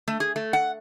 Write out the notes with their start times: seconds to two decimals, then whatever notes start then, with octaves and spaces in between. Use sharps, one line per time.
0.08 A3
0.20 G#4
0.36 A3
0.53 F#5